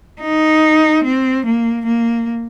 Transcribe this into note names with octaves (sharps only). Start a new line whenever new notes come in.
D#4
C4
A#3
A#3